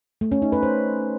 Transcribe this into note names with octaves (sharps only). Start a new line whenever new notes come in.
A3
C#4
D#4
B4
C5